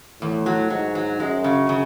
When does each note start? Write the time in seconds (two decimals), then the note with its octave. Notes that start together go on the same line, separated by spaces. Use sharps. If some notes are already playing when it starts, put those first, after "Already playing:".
0.22 E2 A2
0.46 F#3
0.70 G#2 F#3
0.95 F#3
1.20 F#2 G#3
1.44 C#3
1.69 C#3